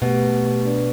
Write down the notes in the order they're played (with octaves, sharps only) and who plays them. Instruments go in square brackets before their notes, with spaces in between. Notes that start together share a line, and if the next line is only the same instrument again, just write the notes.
[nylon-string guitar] B2 [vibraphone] A3 G4 B4
[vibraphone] D4 B4 D5